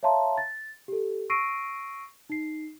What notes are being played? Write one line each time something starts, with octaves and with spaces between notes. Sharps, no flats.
C#5 E5 F5 A5 A#5 C6
A6
G4 A4
C#6 E6 A#6 C7 D7 D#7
D#4 C7